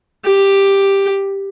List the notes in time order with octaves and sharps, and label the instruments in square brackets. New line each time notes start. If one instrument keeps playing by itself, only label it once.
[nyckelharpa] G4